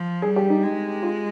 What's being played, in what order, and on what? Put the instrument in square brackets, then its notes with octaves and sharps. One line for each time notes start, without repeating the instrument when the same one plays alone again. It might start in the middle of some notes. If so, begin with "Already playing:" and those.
Already playing: [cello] F3
[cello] G3 [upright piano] G#4
[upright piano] G4
D#4
[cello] G#3
[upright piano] F4